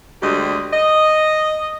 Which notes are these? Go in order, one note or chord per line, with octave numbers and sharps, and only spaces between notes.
D2 G3 G#3 G4 D#5
D#5